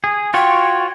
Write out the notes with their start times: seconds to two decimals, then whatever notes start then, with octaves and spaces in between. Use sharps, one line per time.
0.04 G#4
0.34 F4 F#4 C#5 G5